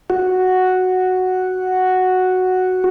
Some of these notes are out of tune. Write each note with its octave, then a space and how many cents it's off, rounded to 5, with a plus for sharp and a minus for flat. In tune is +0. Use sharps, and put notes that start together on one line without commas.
F#4 +0